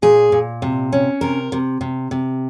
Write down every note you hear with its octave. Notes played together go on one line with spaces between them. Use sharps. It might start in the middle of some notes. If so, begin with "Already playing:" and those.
A#2 G#4
A#2
C3
C#4
C3 A#4
C3
C3
C3